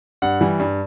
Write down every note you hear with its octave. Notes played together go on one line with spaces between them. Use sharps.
G2 F#5
E3 G3
G2